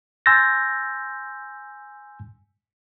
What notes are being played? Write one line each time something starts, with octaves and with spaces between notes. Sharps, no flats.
G#5 C6 E6 G6 A6 A#6